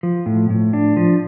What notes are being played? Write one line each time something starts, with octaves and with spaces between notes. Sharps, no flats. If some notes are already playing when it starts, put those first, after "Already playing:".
F3
A2
A2
D4
F3